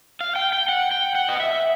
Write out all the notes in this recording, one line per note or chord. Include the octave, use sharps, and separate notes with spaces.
F5
G5
G5
F#5
G5
F#5
D#5
E5